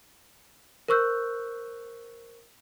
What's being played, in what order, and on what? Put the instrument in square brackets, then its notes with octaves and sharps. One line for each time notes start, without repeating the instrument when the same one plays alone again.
[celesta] A#4 C5 C#6 E6 F#6 G6